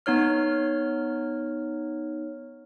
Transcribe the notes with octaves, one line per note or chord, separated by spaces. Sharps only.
B3 D#4 C#5 F6